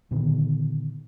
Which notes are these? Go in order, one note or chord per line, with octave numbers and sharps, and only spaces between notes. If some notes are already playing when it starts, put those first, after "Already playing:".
A#2 D3 D#3 B3